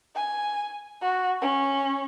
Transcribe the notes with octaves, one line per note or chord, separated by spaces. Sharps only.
G#5
F#4
C#4